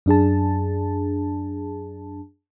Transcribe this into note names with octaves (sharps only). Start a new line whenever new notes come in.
F#2 D4 G#4 A5